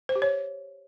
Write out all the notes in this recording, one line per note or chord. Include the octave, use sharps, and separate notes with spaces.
C5
G4
C#5